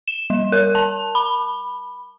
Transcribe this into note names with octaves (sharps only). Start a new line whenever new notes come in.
E7
G3
A#4
A5
B5